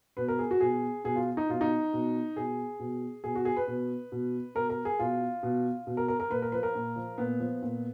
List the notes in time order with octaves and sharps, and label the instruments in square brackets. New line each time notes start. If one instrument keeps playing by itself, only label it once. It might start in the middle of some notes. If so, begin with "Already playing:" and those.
[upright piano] B2 B4
A#4
G#4
F#4
B2 G#4
B2 G#4
F4
D#4
B2 F4
D#4
B2
B2 G#4
B2
B2 G#4
F#4
G#4
B4
B2
B2
B2 A#4
A#4
G#4
B2 F4
B2
B2
A#4
A#4
A#4
A#2 B4
A#4
F3 B4
A#4
A#2
F3
A#2 B3
F3
A#2